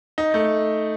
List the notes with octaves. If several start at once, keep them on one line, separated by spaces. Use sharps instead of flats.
D#4
A3